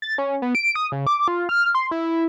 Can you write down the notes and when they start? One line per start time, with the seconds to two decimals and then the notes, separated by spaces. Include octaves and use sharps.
0.02 A6
0.18 C#4
0.42 B3
0.55 D7
0.76 D#6
0.92 C#3
1.07 D6
1.28 F4
1.49 F6
1.75 C6
1.91 E4